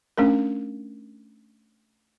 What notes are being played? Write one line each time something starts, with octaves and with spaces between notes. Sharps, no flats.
A3 C#4 D4 A#4